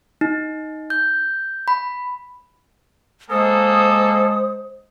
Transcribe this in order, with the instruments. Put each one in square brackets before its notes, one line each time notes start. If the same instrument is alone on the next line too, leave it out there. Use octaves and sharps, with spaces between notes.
[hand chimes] D#4
G6
B5
[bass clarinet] G#3 [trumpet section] A#3 G#4 A4 [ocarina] C5 [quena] D#6